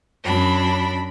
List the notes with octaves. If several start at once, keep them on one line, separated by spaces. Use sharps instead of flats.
F#2 D4 B5